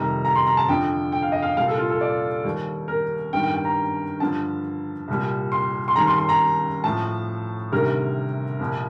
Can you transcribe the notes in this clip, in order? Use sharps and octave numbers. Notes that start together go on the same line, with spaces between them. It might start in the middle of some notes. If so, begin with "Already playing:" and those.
Already playing: F2 C3 D#3 G3 A#5
A#5
C6
A#5
A5
F2 D3 F3 G5
G5
F5
D#5
F5
C2 A#2 G3 F5
A4
F4
A4
D5
D#2 D#3 G3
A#4
G2 D#3 G3 G5
G5
G5
A#5
G2 D3 F3 A5
C2 A#2 G3
C6
C6
D#2 D#3 G3 A#5
C6
C6
A#5
A2 F3 A5
D2 C3 D#3 G3 A#4
C2 A#2 F3